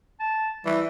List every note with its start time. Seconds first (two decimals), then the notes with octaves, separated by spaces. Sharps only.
0.20 A5
0.66 E3 G3